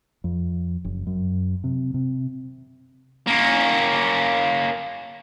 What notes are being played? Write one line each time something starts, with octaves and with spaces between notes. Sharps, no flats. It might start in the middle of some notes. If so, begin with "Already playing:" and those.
F2
F#1
F#2
C3
C3
A#3 C#4